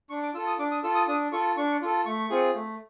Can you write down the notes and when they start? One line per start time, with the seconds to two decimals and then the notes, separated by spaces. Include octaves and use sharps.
0.10 D4 C#6
0.22 D6
0.34 F4 E6
0.38 A4
0.47 D#6
0.59 D4 D6
0.71 D#6
0.84 F4 A4 E6
0.95 D#6
1.08 D4 D#6
1.32 F4 A4 C#6
1.57 D4 C#6
1.82 F4 A4
2.06 A3 C#6
2.30 C4 F4 G#4
2.55 A3